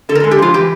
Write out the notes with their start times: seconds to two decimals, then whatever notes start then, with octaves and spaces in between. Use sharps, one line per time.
0.09 D3 A4
0.15 A#4
0.20 A4
0.24 G#3
0.31 G4
0.39 F3 F4
0.54 E3 G4